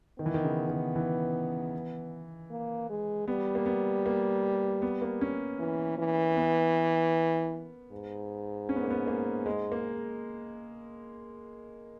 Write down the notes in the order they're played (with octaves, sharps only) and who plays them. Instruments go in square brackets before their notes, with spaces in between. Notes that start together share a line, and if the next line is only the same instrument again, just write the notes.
[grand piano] D#3 [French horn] B3
[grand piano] E3
D#3
C#3
D#3
E3
[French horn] A#3
G#3
[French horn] G3 [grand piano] B3
[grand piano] A#3
B3
A#3
B3
A#3
C#4
[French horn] E3
E3
[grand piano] B3
[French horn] G#2
[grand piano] C#4
B3
A#3
B3
A#3
G#3
A#3